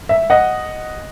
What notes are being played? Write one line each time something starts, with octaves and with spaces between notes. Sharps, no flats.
E5
D#5 F#5